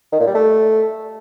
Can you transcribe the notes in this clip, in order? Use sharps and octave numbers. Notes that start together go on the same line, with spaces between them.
D#3
A#2
G3
A3